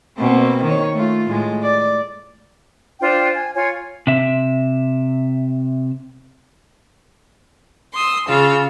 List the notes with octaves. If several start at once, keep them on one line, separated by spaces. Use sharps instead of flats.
B2 A#3 C4
D#3 C#5
A3 F4
A2 G#3
D5
D4 F4 C5 G5
G#5
F4 C#5 G#5
C3 E5
C6 D#6 E6
C#3 F4 F5 E6